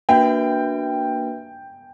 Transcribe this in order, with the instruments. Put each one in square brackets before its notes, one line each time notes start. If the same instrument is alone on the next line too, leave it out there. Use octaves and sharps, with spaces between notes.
[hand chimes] A#3 D4 F#4 B4 E5 [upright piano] G5